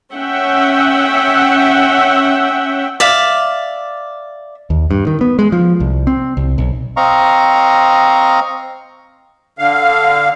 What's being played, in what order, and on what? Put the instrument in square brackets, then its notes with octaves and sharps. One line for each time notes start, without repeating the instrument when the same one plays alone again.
[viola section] C#4 E5 F#5 G5
[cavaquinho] D5 E5 F5
[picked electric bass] D#2
G2
D#3
B3
G#3
F3
C2
C4
C2
B1
[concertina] C4 D#5 F5 A#5 C#6
[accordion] D3 F5